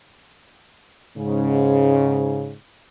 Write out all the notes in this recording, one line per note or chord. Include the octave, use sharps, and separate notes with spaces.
G#2 C#3